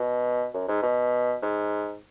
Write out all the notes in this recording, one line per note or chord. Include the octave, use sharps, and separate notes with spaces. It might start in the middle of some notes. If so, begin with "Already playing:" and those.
Already playing: B2
F#2
G#2
B2
G#2